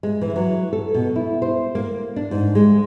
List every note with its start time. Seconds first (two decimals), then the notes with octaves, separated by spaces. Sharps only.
0.03 G#3
0.21 E3
0.36 F#3
0.73 A4
0.94 B2
1.16 E4
1.42 C5
1.75 A#3
2.16 D4
2.31 G#2
2.55 G#3